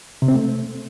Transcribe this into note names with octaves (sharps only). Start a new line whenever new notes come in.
C3
C4
A3